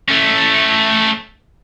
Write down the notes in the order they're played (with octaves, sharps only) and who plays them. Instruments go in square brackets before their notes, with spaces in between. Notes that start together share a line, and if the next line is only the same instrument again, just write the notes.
[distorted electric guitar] A3 C#4